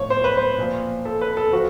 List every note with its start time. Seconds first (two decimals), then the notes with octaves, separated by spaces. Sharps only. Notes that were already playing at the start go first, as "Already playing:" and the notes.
Already playing: A2 F3 C#5
0.10 C5
0.24 B4
0.37 C5
0.58 A#2 F3
1.05 A4
1.21 B4
1.37 A4
1.53 F3 F#4